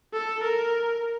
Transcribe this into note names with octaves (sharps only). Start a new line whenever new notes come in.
A4
A#4